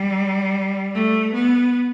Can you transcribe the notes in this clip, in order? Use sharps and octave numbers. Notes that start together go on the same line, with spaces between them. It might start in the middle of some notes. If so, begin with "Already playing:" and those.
Already playing: G3
A3
B3